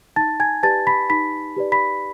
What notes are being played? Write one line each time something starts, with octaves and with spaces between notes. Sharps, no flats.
D#4 A5 A6
G#5 G#6
G4 B4 D5 A5 A6
B5 B6
D#4 B5 B6
G4 B4 D5
B5 B6